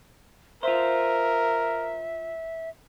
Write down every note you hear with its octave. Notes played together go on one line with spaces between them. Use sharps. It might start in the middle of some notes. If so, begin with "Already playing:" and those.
F4 A#4 C5 E5